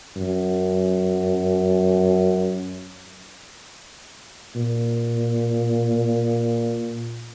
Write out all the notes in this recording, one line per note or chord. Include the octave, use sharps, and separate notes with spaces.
F#2
A#2